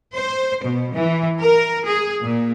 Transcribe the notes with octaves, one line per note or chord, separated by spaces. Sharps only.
C5
B2
E3
A#4
G#4
A#2